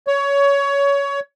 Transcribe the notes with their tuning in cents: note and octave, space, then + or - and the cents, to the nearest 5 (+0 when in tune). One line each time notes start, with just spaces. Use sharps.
C#5 +20